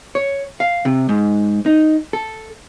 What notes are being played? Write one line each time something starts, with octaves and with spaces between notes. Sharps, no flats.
C#5
F5
C3
G#2
D#4
A4